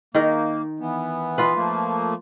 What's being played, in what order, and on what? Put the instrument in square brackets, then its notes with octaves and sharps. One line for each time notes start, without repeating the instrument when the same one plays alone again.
[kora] D#3 D#4 A#4 [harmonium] A#3
[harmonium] E3 B3
[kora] F4 B4
[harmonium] F3 A3 A#3